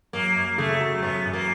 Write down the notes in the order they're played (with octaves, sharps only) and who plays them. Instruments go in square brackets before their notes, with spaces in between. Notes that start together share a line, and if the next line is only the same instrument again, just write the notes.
[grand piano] F#2 [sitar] A#3
[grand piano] F#2
[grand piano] C#3 [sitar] A3
[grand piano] F#3
[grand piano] F#2 [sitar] B3
[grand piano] F#2
[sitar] A#3